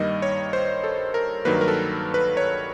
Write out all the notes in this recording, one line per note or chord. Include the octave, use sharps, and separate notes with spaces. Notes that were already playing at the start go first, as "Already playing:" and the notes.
Already playing: G2 D#3 G3 A#3 D#5
C#5
C5
A4
A#4
G2 D#3 F#3 A#3 B4
A#4
A4
B4
C#5